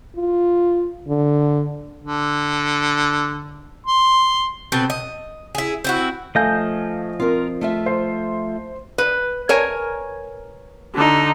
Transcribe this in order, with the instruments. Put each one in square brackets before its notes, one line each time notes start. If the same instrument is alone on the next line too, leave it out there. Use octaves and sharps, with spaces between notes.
[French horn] F4
D3
[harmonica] D3
C6
[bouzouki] B2 C4 A4 B4
D#5
E4 G#4
C4 E4 F#4
[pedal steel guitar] F3 D#5 G6 [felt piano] A3 F5 G#5
[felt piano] C4 [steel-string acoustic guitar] F4 A#4
[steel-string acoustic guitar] A3 F4 E5
[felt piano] C5
[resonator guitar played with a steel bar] B4
A#4 C#5 G#5
[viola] D3 D#4